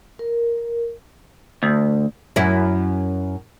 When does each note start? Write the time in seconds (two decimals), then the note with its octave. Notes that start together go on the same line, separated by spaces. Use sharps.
0.19 A#4
1.63 D2
2.36 F#2 E4